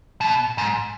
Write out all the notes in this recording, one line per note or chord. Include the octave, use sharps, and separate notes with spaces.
B2
G#2